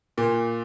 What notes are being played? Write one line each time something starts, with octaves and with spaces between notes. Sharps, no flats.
A#2